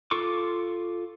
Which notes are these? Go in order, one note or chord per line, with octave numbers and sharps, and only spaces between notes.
F4 A4 C#6 D6